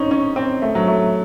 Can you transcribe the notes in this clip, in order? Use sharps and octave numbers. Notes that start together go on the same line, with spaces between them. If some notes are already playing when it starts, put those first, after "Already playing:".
Already playing: C4 C#4 D#4
C#4
C4
A3
F#3
A3